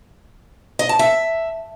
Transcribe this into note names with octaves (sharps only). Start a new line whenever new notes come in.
D#5
A5
E5